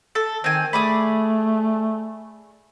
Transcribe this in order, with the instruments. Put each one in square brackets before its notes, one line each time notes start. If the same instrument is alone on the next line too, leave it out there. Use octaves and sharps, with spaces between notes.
[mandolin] A4
[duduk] D#3 [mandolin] C4 G#5
[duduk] A3 [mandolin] G#4 D5 B5